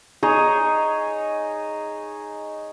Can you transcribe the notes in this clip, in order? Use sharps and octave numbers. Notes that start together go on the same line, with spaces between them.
D#4 G#4 C#5 D#5